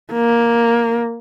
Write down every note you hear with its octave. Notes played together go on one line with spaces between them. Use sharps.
A#3